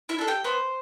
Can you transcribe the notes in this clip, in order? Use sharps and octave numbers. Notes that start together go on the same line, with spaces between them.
E4 E5
D4 A4
G4 G5
B3 C5 C6